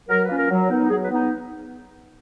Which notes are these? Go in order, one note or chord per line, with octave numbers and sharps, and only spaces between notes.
F#3 A#4
B4
A#3 C#4 F4
A#4
F#3
B3 D#4
F#3 G#4
B4
B3 D#4